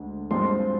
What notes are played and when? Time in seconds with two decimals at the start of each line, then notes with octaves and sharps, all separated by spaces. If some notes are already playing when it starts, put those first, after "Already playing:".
Already playing: D2 D3 G#3
0.31 G2 F3 G#3 C4 F4 C6